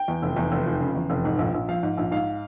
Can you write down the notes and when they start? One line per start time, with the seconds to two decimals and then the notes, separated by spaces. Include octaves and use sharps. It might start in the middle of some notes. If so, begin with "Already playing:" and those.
Already playing: G5
0.08 E2
0.22 F1
0.36 E2
0.52 F1
0.66 F3
0.80 C#3
0.95 E2
1.10 F1
1.25 G#2
1.39 A#1
1.54 A#1
1.69 F3 F5
1.83 G#2
1.97 A#1
2.11 G#2 F5